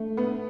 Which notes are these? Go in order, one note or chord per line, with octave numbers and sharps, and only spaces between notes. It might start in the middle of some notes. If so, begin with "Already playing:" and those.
Already playing: A3
B3